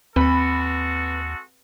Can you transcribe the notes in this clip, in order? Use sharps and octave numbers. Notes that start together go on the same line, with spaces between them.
D#2 G#3 C4 F#4 A4 B4 B5